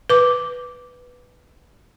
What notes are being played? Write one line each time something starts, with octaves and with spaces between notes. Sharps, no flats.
B4 D6